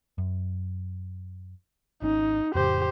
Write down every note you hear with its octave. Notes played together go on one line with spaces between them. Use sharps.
F#2
G#1 C#4 D#4
F2 A2 C#3 G4 C5